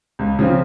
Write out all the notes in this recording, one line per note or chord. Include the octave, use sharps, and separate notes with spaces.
C#2
C#3 F3 C4